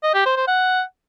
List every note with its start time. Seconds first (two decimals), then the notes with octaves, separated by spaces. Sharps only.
0.03 D#5
0.14 G4
0.25 C5
0.36 C5
0.48 F#5